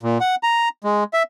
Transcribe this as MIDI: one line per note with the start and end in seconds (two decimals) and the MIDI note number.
0.03 0.18 46
0.21 0.35 78
0.43 0.69 82
0.84 1.04 56
1.13 1.23 76